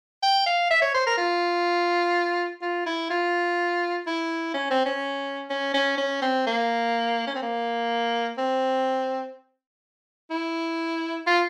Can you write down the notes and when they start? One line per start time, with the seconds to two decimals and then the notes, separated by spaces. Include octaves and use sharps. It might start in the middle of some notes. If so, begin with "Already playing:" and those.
0.22 G5
0.46 F5
0.71 E5
0.82 C#5
0.94 C5
1.07 A#4
1.17 F4
2.62 F4
2.86 E4
3.10 F4
4.07 E4
4.54 C#4
4.70 C4
4.85 C#4
5.50 C#4
5.74 C#4
5.98 C#4
6.22 C4
6.47 A#3
7.27 C#4
7.35 C4
7.42 A#3
8.38 C4
10.30 E4
11.27 F4